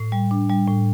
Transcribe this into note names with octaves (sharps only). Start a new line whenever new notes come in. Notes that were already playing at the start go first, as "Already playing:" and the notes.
Already playing: A2
G3
D4
G3
A2